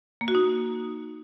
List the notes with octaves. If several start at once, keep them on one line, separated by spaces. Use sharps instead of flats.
A#3
F#4
D#4